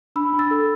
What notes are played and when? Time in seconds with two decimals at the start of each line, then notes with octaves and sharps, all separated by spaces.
0.16 D4 B5 E6
0.33 D4
0.39 E6 A6
0.51 A4